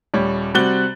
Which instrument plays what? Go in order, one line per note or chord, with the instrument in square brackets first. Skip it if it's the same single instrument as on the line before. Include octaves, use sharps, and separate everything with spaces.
[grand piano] D#1 G3 C#5
C3 G3 F#4 F#6 A6 G7